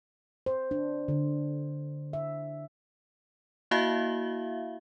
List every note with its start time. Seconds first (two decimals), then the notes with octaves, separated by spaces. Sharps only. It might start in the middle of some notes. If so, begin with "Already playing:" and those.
0.46 C5
0.71 D4
1.08 D3
2.13 E5
3.71 A#3 E4 F#4 E5 F5